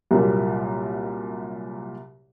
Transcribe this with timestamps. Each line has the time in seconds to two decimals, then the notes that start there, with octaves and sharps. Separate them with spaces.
0.11 C2 F#2 A#2 G3 A#3